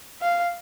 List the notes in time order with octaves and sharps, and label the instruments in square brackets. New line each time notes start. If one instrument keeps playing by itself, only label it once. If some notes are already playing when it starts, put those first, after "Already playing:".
[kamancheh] F5